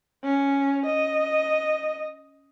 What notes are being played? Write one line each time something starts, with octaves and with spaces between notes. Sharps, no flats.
C#4
D#5